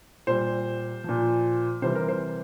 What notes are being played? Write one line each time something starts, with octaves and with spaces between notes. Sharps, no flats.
A#2 G3 C5
A#2 F3
C3 E3 G3 C5
A#4
C5